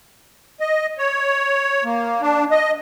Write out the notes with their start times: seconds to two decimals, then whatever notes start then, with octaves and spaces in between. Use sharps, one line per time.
0.60 D#5
0.98 C#5
1.84 A#3
2.21 D4
2.51 D#5